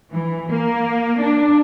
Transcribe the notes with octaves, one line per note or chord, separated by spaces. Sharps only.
E3
A#3
D4